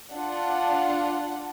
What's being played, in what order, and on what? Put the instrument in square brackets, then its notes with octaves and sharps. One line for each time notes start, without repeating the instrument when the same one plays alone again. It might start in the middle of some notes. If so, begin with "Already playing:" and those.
[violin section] D4 F4 F#5